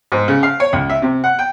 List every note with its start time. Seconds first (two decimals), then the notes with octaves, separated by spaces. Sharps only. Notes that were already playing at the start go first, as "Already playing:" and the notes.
0.12 G#2
0.28 C#3
0.43 F5
0.60 C#5
0.73 C#2
0.90 E5
1.02 C3
1.24 F#5
1.39 G5